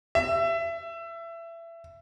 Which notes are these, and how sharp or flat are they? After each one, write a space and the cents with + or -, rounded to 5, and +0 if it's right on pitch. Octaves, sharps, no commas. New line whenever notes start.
E5 +25